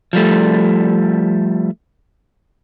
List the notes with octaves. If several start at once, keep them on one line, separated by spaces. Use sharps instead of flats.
F3 G3 A3